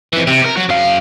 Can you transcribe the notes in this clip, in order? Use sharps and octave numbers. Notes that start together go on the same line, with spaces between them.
F2 E3
C3
G4 A#4
F#3 F#4
F#2 F5